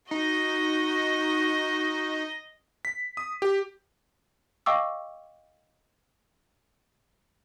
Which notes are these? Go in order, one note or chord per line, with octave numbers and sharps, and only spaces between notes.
D#4 F#4 D#5
B6
D#6
G4
D#5 F5 G5 C#6 D6 E6